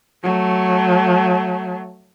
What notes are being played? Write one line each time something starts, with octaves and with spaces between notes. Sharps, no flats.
F#3 A3